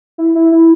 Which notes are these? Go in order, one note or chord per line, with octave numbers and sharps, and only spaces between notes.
E4
E4
E4